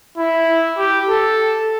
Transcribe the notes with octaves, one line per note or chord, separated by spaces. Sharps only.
E4
G4
A4